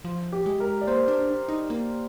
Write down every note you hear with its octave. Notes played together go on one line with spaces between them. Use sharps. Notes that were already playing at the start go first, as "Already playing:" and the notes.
F3
G4
G#3
A#4
D5
A#3 C5
D4
D#4
A#3